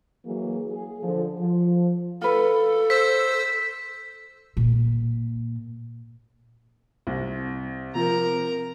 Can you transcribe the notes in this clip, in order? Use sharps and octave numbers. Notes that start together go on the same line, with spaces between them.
E3 F#3 A#3 G#4
G#4
D3 F3
F3
F4 A4 B4
C5 E6 B6
A#2
C2
C3 F3 A#4 A#5